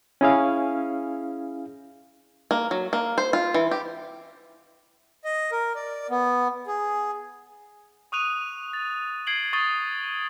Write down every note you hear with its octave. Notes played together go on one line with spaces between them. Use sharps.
C#4 E4 G#4 F5
A#3
F#3
A#3
C5
F4
E3
G4
D#5
A#4
D5
B3
G#4
C#6 D#6 F#6 D#7 F7
A6
G#6 C7 D7 F#7 G7
C#6 D#6 A6 G7